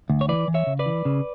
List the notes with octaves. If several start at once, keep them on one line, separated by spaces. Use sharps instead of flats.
D2
C#5
E3 B4 D5
E3
C#5 E5
C#3
B4 D5
E3
C#3